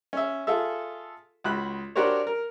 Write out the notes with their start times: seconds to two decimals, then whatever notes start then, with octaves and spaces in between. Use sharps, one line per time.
0.13 C#4 E5
0.47 F4 G#4 A4 E5
1.44 C#2 F#4 B5 F#6
1.96 D4 F#4 G4 A#4 C5 C#5
2.27 A#4